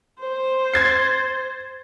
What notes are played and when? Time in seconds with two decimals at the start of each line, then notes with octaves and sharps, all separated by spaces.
0.21 C5
0.74 G#6 A6 C7